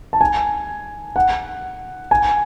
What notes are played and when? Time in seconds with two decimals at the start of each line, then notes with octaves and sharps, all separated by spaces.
0.13 A5
0.21 G#5
1.16 F#5
2.11 G#5